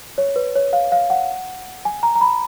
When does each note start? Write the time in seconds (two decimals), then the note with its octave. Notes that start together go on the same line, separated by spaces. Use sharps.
0.18 C#5
0.36 B4
0.56 C#5
0.73 F5
0.92 F5
1.10 F#5
1.85 G#5
2.03 A#5
2.15 A#5
2.21 B5